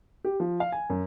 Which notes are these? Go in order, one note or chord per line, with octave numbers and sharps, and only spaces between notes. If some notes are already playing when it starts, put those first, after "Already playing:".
G4
F3
F5
G#5
F#2